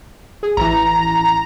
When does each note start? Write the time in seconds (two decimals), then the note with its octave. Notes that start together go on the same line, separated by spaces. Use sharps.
0.43 G#4
0.57 A1 E3 A#5